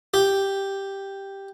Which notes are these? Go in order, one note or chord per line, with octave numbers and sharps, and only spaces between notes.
G4